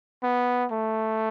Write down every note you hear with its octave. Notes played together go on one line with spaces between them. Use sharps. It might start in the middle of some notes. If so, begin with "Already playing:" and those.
B3
A3